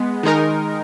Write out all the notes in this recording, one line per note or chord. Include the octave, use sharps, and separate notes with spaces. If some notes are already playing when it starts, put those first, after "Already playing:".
Already playing: G#3 B3
D#3 G#3 D#4 A#4